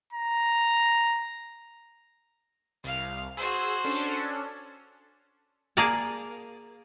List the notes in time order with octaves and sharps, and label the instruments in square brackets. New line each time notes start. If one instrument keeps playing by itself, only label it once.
[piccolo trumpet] A#5
[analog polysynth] C2 [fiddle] F5 F6
[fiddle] F#4 C5 [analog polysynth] G#4 E6
[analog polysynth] C#4 D4 A4
[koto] A#3 G#4 A#4 D5 A5